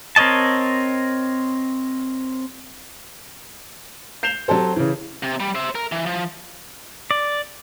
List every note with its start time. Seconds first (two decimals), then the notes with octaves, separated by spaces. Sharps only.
0.16 C4 A#4 C#5 D#5 A5
4.23 G6 C7 E7 F7 G7
4.48 F#3 C4 G4 A4 C5
4.76 C#3 E3
5.23 C3
5.40 G3
5.55 C5 E5
5.75 A#4
5.92 E3
6.06 F3
7.11 D5